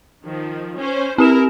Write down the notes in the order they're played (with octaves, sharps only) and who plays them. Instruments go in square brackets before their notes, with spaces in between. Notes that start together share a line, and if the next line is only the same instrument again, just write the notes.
[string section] D#3 F3
C#4 C5
[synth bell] C4 G4 E7 [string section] E4 A#4